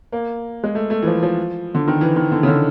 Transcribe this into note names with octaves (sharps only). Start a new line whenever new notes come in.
A#3
G#3
A3
A3
E3
F3
F3
D3
D#3
E3
D#3
D3
C#3
D3